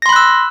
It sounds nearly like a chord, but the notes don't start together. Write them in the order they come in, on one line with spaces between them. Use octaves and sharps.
A#6 C6 B5 F#6 E6